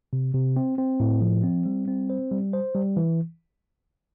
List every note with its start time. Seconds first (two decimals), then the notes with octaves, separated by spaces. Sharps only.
0.13 C3
0.34 C3
0.56 C4
0.78 C4
1.00 A2
1.21 F3
1.44 C4
1.66 G3
1.88 C4
2.10 C5
2.32 G3
2.53 C5
2.75 G3
2.97 E3